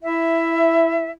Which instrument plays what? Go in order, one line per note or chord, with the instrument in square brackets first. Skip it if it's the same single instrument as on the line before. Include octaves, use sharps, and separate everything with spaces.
[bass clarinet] E4 [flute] E5